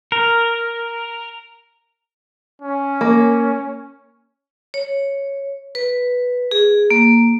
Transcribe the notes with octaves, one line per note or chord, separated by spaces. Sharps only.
A#4
C#4
A#3
C#5
B4
G#4
A#3